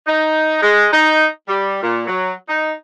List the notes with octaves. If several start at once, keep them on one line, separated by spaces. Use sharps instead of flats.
D#4
G#3
D#4
G3
A#2
F#3
D#4